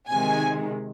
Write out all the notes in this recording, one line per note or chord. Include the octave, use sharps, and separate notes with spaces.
C3 D#3 G#3 G#5